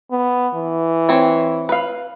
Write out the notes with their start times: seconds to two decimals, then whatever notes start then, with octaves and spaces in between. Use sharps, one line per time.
0.11 B3
0.55 E3
1.09 C4 C#5
1.69 B4 F5